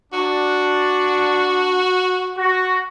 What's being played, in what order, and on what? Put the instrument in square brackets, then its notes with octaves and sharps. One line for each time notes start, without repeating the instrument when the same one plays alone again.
[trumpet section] D4 [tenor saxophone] F#4
[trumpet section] F#4